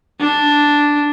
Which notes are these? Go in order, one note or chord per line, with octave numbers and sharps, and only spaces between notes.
D4